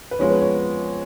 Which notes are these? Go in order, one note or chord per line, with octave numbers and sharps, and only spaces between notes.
B4
F2 F3 G#3 B3 C#4 C#5
B3 B4
C#4 C#5